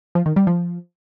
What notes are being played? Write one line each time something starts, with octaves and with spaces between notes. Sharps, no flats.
F3
D#3
G3
F3